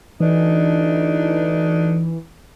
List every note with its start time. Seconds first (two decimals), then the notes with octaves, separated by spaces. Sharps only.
0.20 D2 E3 D4 D#4